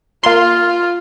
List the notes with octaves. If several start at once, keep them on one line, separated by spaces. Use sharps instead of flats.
A#3 F4 C6